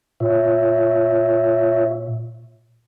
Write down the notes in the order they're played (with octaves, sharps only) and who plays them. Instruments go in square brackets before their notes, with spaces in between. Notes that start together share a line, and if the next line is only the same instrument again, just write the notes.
[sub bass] A#2 [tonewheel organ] F4 C#5 E5